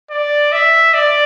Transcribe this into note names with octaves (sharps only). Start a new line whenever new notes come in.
D5
E5
D5